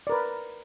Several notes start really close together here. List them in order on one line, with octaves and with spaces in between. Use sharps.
D5 A#4 B4